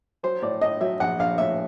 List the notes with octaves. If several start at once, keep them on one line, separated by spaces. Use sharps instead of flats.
F#3 C5
A2 D5
A2 D#5
F#3 E5
A#1 F#5
A#1 F5
A2 E5